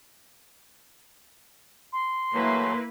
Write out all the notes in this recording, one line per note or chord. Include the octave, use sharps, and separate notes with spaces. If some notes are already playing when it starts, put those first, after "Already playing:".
C6
E3 F#3 A3 A#3 E4 B4